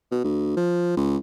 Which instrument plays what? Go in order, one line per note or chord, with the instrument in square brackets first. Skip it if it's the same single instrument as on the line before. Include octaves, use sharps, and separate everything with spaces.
[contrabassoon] B2
D2
F3
C#2